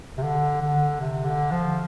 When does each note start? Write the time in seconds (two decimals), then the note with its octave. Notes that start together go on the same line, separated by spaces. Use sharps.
0.17 C3
0.23 D3
0.62 D3
1.01 C3
1.25 D3
1.51 F3